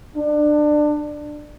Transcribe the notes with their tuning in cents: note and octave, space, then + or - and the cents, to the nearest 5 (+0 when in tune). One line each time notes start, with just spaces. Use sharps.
D4 +20